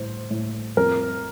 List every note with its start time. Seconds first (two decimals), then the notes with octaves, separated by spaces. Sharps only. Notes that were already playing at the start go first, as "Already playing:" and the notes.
Already playing: A2 C5
0.31 A2
0.77 F2 A#4